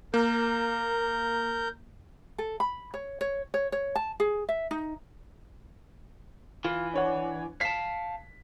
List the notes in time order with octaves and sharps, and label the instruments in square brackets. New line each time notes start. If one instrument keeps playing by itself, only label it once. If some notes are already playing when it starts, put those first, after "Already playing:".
[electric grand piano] A#3 [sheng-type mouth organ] A#4 G6
[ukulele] A4
B5
C#5
C#5
C#5
C#5
A5
G#4
E5
D#4
[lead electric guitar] E3 [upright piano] F4
[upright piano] D4 C#5 F#5
[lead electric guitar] F5 A5 [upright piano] B6